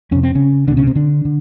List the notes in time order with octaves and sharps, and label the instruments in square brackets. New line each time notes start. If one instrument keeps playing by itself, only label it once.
[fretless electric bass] F2 C3 C#4
C4
C#3 C#4
C#2 B2 D3 D4
C#3 C#4
C3 C4
D3 D4
D3